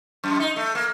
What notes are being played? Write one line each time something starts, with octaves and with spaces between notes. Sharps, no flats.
F#2
D#4
A3
A#3